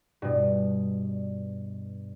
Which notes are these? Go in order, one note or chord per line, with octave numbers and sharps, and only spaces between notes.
G2 B2